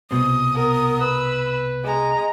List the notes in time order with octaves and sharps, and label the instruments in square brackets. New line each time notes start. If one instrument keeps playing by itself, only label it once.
[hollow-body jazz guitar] C2 B2 C4 [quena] D#6
[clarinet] B3 [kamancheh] A#4
[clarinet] B4 [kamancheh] B5 E6
[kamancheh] G#3 A#5 [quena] D#5